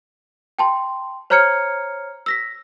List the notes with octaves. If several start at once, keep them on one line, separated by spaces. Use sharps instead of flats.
G5 A5 C6
C5 C#5 A#5 F6 G#6 C#7
E6 A#6 B6